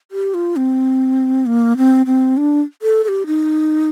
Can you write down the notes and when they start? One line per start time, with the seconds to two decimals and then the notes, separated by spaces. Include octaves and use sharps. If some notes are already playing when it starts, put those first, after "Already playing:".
0.11 G4
0.34 F4
0.56 C4
1.46 A#3
1.77 C4
2.06 C4
2.37 D4
2.82 A4
3.04 A4
3.08 G4
3.27 D#4